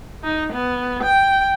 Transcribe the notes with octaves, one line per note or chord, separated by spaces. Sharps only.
D#4
B3
G5